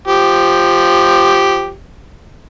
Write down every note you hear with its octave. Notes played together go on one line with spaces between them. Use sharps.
F3 G4